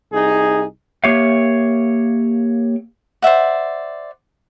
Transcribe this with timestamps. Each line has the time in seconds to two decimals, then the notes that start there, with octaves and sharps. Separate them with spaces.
0.12 C2 D#4 G#4
1.04 A#3 G4 C#5 E5 F5
3.22 C5 D5 E5 F#5